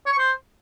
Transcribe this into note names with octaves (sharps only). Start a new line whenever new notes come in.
C#5
C#6
C5